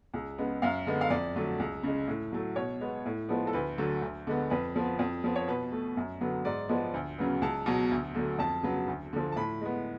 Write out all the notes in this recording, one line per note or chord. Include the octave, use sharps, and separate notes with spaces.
C#2
C#3 G#3 B3
F#2 F5
D3 G#3 B3
F5
F2 D5
D3 F#3 A3
C#2
C#3 G#3
A2
F#3 A3
B2 C#5
G#3 B3
A2
F3 G#3 B3
A4
D2 B4
D3 F#3 A3
D2
D3 G#3 B3
F2 B4
F3 B3
F2
F3 B3
C#5
B2 B4
A3
F#2
D3 F#3 B3
G#2 D5
F3 G#3 B3
D2
C#3 F#3 B3
C#2 A5
B2 F#3
D2
D3 F#3 A3
F2 A5
C#3 F#3 B3
D2
D3 F3
A5
A2 B5
G#3 B3